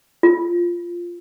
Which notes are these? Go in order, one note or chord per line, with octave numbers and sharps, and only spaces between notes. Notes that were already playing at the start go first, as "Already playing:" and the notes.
F4